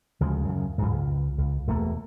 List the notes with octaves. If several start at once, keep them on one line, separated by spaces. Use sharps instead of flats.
D2 C#3 F3 G#3
F#2 C#3
F2 G#2
C#2
C#2
E1 E2 A3 A#3